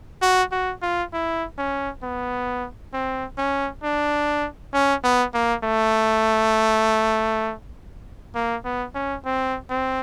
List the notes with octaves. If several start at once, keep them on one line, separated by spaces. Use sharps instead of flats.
F#4
F#4
F4
E4
C#4
B3
C4
C#4
D4
C#4
B3
A#3
A3
A#3
B3
C#4
C4
C4